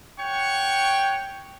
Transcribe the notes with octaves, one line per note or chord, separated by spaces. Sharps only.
C#5 F#5 G5 C#6